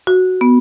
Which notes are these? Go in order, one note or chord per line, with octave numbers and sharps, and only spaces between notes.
F#4
B3